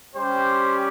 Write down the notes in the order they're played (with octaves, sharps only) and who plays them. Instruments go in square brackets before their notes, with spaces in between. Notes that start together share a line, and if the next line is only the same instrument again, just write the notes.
[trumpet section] G3 C#4 G4 C5